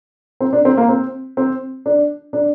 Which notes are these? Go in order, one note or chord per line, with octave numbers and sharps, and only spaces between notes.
C4
D4
C4
A#3
C4
C4
D4
D4